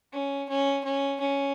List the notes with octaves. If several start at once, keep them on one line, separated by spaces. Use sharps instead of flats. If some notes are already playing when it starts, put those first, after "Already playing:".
C#4
C#4
C#4
C#4